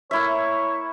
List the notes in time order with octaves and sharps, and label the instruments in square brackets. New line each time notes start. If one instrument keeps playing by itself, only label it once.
[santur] A#3 E4 E5 [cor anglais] C#5